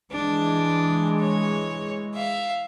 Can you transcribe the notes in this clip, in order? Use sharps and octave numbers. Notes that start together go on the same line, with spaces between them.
E3 G#3 D4
C#5
E5 F5